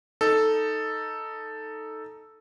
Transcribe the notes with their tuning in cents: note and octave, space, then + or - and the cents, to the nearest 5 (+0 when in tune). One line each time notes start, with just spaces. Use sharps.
D#4 +0 A4 +0